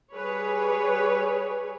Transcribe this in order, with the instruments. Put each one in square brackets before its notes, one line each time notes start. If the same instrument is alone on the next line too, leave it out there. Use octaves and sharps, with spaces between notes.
[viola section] G3 G#4 B4 C#5